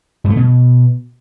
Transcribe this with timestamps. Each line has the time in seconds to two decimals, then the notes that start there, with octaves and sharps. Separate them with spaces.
0.24 G2
0.30 A3
0.36 B2